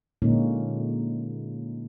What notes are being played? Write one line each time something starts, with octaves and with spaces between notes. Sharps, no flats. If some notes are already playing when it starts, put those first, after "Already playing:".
A#2 D3 G#3 A#3 C#4 D#4